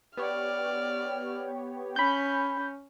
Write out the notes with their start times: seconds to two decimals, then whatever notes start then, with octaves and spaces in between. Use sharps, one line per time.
0.17 B3 G4 C#5 D5 F6
1.96 C#4 B5 G6